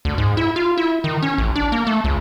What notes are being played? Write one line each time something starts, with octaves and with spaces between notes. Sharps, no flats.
D2
G#2
E4
F4
E4
D#3
C#4
A1
D4
A#3
A3
C#2